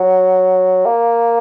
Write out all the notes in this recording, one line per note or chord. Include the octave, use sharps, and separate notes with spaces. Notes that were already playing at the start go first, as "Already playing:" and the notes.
Already playing: F#3
A#3